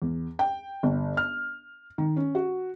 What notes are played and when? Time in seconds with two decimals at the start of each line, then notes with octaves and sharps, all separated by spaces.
0.02 E2
0.39 G5
0.83 G1
1.17 F6
1.98 D#3
2.16 C#4
2.35 F#4